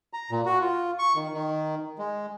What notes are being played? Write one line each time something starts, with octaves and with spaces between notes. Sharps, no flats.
A#5
A#2
F#4
F4
C#6
D#3
D#3
G#3